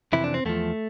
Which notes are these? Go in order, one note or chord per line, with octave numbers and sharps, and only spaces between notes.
F2 C3 E3 E4
D4
C4
E2 D3 F3 A3